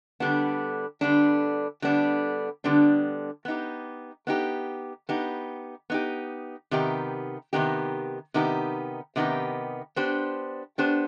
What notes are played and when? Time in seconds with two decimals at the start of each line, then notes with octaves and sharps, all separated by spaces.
0.20 D3 G3 B3 D4
1.01 D3 G3 B3 D4
1.82 D3 G3 B3 D4
2.64 D3 G3 B3 D4
3.45 B3 D#4 G4
4.27 B3 D#4 G4
5.09 B3 D#4 G4
5.90 B3 D#4 G4
6.71 C3 D#3 B3 D#4 G4
7.53 C3 D#3 B3 D#4 G4
8.34 C3 D#3 B3 D#4 G4
9.16 C3 D#3 B3 D#4 G4
9.96 B3 D4 G4 C5
10.78 B3 D4 G4 C5